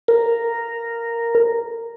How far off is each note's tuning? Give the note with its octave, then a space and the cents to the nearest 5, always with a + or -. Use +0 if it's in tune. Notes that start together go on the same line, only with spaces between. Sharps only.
A#4 -5